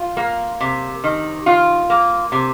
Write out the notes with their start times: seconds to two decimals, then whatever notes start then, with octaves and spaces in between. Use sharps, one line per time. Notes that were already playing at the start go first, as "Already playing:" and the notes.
Already playing: F4
0.17 A#3
0.60 C3
1.04 D#3
1.46 F4
1.90 A#3
2.32 C3